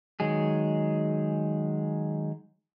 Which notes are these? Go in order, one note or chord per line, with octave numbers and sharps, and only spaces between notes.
D#3 F#3 G#3 G#4